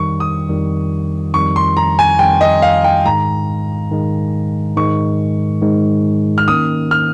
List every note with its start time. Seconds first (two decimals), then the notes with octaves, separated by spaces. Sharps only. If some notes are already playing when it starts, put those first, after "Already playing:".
Already playing: F2 D#3 G3 C#6
0.20 D#6
0.49 F2 D#3 G3
1.34 F2 D#3 G3 C#6
1.56 C6
1.77 A#5
1.99 G#5
2.19 F2 D#3 G3 G5
2.41 D#5
2.62 F5
2.84 G5
3.05 G#2 D#3 G#3 A#5
3.91 G#2 D#3 G#3
4.76 G#2 D#3 G#3 C#6
5.62 G#2 D#3 G#3
6.38 F6
6.48 D#3 A#3 C#4 D#6
6.91 F6